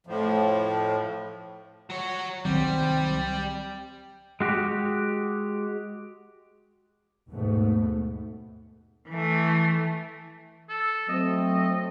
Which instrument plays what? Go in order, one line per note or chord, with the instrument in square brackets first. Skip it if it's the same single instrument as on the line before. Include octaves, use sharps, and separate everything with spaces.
[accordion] F2 A2 F3
[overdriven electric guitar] F#3 C#5
[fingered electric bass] C2 D#3 F#3 [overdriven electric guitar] G3 [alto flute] C4
[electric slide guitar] G#3 F#4 G4
[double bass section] D#2 G#2 B2 A3 B3
[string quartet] E3 A3
[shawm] A4
[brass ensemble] F#3 A3 C4 [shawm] D#5